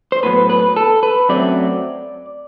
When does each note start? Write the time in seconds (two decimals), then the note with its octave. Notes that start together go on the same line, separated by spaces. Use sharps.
0.12 C5
0.23 A2 F#3 B3 B4
0.50 B4
0.76 A4
1.03 B4
1.29 F#2 F#3 A3 C4 D5